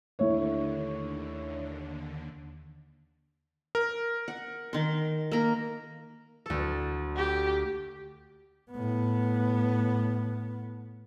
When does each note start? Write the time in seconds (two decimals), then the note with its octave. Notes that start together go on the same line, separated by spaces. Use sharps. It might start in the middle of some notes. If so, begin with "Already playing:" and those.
0.19 D#2 D3 A3 E4 C#5
3.75 A#4
4.28 F#5
4.73 D#3 C6
5.32 A#3 A#4
6.46 D2 A4
7.17 G4
8.71 A2 B3